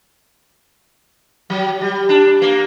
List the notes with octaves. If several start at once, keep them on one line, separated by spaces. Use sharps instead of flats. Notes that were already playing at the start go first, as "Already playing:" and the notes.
F#3
G3
D4
A#3